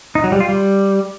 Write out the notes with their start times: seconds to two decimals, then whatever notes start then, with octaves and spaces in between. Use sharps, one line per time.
0.15 D#4
0.24 F#3
0.32 G3
0.40 F4
0.49 G3